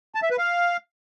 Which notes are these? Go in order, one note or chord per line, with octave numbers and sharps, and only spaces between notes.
A5
E5
B4
F5